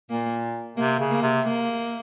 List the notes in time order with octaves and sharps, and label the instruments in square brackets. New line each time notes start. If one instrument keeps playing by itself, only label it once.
[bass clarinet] A#2 [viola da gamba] A#3
[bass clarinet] C3 [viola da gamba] A#3
[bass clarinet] C#3
[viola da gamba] A#3
[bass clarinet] C3
[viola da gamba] A#3